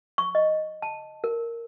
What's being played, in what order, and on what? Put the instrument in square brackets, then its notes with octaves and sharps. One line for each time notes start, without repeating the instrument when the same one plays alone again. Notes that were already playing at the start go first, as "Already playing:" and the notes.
[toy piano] C#6
D#5
A5
A#4